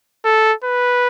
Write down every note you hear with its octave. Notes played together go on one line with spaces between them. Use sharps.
A4
B4